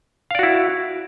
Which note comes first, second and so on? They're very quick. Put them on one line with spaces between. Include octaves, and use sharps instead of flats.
F5 D5 F#4 E4